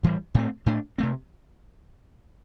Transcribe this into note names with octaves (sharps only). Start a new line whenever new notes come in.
A2 E3 G3
A2 A3 C4
A2 A3 D4
C3 A3 C4